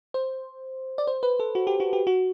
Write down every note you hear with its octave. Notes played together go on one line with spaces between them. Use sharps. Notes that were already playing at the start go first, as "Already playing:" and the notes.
C5
D5
C5
B4
A4
F#4
G4
F#4
G4
F#4